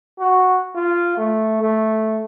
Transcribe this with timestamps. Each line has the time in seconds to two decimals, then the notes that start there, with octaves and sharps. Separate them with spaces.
0.19 F#4
0.75 F4
1.17 A3
1.61 A3